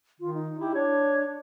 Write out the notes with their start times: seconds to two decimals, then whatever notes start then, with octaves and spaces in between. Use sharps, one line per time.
0.20 D#3 F4
0.34 D#4
0.60 E4 G4
0.75 D4 C#5